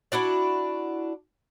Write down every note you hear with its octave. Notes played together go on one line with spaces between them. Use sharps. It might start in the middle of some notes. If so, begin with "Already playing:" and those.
D4 E4 F#4 D5